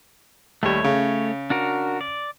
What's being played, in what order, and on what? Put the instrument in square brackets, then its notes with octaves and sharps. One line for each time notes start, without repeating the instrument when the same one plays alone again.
[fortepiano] D#2 G3 [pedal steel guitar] A3 C#5
[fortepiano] C#3
[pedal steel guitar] D4 F#4 A#4
D5